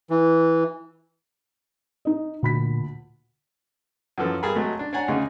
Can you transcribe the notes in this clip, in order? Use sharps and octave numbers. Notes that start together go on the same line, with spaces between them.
E3
D#4 D#5
D2 A#2 B5 B6
F#2 E3 F3 A4
G2 G#4 A#4 B5
F#3 G#3 A3
D4
D4 C#5 D5 F#5 G#5 A#5
D2 C#3 D#4 G#4